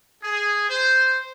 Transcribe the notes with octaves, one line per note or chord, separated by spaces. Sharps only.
G#4
C5